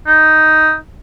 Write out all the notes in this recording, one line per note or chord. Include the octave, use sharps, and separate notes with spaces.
D#4